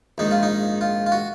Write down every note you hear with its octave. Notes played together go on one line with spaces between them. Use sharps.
A#1 G#2 D#3 D#4
F4
D#4
F4
F4
F#4